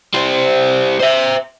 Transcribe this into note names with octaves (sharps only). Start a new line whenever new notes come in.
G3 C5
C5 E5